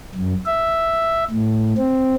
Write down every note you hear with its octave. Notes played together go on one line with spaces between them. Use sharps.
F#2
E5
A2
C4